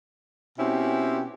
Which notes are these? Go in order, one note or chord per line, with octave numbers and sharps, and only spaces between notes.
B2 C4 C#4 E4 G4